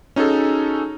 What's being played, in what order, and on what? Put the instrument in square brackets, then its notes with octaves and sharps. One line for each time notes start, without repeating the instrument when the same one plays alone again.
[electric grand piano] C#4 D#4 F#4 G#4 A4